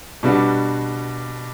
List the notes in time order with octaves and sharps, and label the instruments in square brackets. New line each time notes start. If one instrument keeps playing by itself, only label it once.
[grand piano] B2 G3 D4 F#4